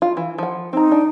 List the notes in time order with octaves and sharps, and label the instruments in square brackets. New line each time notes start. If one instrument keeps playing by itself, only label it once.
[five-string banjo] F4
E3
F3 F#5
[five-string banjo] C4 A#5 [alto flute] D#4
[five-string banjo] D4